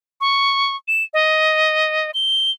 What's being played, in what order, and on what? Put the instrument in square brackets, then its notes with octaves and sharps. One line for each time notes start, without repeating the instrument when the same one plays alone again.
[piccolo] C#6
E7
D#5
G7